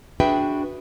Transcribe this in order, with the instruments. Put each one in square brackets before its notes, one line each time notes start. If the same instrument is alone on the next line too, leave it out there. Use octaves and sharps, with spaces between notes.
[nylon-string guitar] D4 F#4 G#4 B4 E5 G5